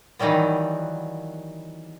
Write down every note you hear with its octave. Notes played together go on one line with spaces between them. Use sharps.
D#3 E3 F#3 G3 B3